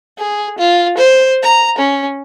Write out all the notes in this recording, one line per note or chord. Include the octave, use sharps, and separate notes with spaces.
G#4
F4
C5
A#5
C#4